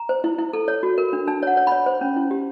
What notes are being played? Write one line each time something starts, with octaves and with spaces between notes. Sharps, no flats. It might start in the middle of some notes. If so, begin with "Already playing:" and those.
Already playing: A#5
C5
E4
E4
A4
C#5
F#4
A#4
D4
D4 A5
C#5 F#5
C#5
C#5 B5
C5
C#4
E4
G4